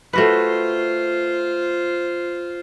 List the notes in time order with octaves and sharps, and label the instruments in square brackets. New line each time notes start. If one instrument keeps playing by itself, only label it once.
[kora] A3 F#4 B4 [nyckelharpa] F4 C5